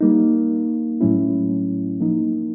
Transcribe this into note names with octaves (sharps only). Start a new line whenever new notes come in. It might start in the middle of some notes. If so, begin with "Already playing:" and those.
G3 A#3 D#4
A2 F#3 A3 C#4 E4
F3 A#3 D#4